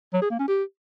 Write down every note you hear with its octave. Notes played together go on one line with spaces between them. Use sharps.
F#3
G#4
A#3
C#4
G4